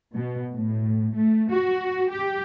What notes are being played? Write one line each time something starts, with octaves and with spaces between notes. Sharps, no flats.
B2
A2
A3
F#4
G4